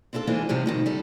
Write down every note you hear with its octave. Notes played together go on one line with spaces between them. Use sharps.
C4 D4 E4 F4 A4
E3 G#3 A#3 C4 D4 F4
A2 C3 F3 G3
F2 B2 D#3
G3 A4